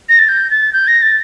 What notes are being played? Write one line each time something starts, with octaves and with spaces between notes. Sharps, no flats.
A#6
A6
G6
A6
G6
A#6
A6